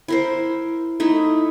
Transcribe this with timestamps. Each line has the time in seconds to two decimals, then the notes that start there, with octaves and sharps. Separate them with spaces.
0.08 E4 A#4 C5
1.00 A3 D#4 E4